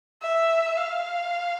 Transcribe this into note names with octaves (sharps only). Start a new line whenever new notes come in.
E5
F5